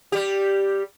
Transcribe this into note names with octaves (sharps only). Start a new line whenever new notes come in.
G3 G4